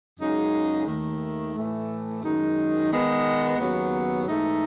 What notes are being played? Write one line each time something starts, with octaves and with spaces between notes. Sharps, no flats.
F#2 C#3 G#3 D#4
D#2 D#3 A3
A2 E3 A3
F#2 D#3 G#3 D#4
D#3 G#3 B3
D#2 C#3 F#3 B3
G#2 E3 A3 D#4